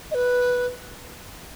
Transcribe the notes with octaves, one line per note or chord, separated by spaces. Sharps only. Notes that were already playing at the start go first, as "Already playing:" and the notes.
D#5
B4